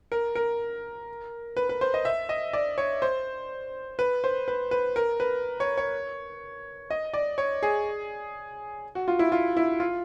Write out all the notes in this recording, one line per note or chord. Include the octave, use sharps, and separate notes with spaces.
A#4
A#4
B4
B4
C5
D#5
E5
D#5
D5
C#5
C5
B4
C5
B4
B4
A#4
B4
C#5
C#5
D#5
D5
C#5
G#4
F#4
F4
E4
F4
E4
F4